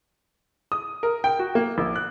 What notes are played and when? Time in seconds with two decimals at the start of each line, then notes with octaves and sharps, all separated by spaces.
0.72 D#6
1.03 A#4
1.24 G5
1.39 F#4
1.55 A#3
1.78 A#1
1.96 F#6